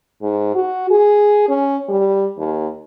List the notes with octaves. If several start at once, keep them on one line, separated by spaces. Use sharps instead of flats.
G#2
F#4
G#4
C#4
G3
D#2